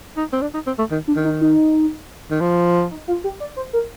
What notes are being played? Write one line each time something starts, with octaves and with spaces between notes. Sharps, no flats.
D#4
C4
D4
D#4
C4
A3
D#3
D4
D#3
D#4
D#4
D#3
F3
D#4
F4
G4
D5
C5
A#4